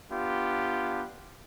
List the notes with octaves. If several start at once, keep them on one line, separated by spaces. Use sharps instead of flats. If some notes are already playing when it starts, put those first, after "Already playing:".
B3 D4 F4 G4